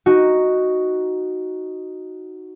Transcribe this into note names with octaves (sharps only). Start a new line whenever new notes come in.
D#4 F#4